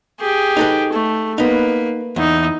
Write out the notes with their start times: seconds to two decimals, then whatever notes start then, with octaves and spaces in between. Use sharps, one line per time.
0.20 G4 G#4
0.57 D#4 A4 B4
0.92 A3
1.38 A#3 B3 D#4 B4
2.16 E2 D#4 E4